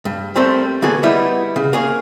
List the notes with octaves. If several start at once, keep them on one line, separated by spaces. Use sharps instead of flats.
G2
G3 A3 C4 A4 A#4 C5
D3 A#3 B3 F#4 G#4 A4
G3 B3 D#4 E4
C#3
A#3 G#4 C#5